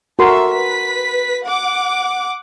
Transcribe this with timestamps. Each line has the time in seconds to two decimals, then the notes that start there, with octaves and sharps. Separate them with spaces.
0.19 F#4 A4 A#4 E5 C6
0.52 B4 B6
1.44 F#5 D6